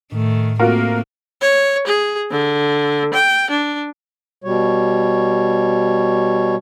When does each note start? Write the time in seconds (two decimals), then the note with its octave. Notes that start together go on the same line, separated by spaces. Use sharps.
0.12 A2 D#3 A3
0.59 A3 A#3 C4 F4 F#4 A#4
1.42 C#5
1.87 G#4
2.31 D3
3.14 G5
3.50 D4
4.44 B2 G3 C#5